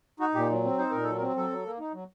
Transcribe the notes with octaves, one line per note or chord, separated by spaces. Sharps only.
D#4 F#4
A#2 G4
F#3
C4
D#4 C5
A#2 A#4
F#3 A4
A#4
C4
F#3 A4
F#3
A#3
D#4
F#3